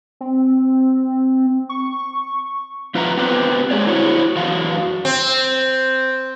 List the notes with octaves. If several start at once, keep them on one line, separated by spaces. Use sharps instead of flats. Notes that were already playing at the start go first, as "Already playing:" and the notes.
C4
C#6
F3 F4 B4 E5 F#5 A#5
B3 C4 G4 B4 C5
G#3 G#4 C#5 D5
E4 F#4 C5 C#5
F#2 E3 F#4 F5
C4